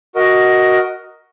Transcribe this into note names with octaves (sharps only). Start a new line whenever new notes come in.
F#4 A#4 D#5